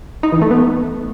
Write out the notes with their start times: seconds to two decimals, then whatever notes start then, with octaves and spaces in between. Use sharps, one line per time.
0.23 D#4
0.32 E3
0.41 A3
0.51 B3